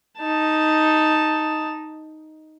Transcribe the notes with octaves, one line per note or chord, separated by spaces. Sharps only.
D#4 A5